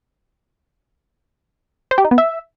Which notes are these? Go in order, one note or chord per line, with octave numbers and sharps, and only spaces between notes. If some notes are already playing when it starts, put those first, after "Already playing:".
C5
G4
D#4
B3
E5